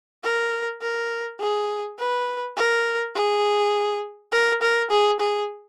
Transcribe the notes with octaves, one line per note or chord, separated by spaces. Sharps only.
A#4
A#4
G#4
B4
A#4
G#4
A#4
A#4
G#4
G#4